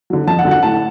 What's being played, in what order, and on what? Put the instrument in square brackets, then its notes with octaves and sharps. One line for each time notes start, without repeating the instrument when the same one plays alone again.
[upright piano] D3 F#3
F2 A5
F#5
D3 F#3
F#5
A2 A5